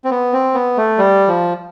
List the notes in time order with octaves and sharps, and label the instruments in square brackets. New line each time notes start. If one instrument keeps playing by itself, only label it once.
[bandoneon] C4
B3
C4
B3
A3
G3
F3